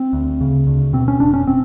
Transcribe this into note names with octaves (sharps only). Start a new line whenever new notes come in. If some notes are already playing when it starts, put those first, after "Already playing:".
Already playing: C4
D2
C#3
D2
B2 C4
C#4
F1 D4
C#4
C4